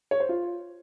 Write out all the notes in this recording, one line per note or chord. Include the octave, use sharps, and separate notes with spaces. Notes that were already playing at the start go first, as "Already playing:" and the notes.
C#5
C5
F4